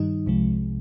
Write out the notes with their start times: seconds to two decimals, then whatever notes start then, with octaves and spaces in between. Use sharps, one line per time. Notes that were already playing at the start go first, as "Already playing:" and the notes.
Already playing: G2 D#3 G3 D#4
0.26 C2 C3 F3 G#3